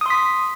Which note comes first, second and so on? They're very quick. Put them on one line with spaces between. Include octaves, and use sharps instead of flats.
D#6 C6 B6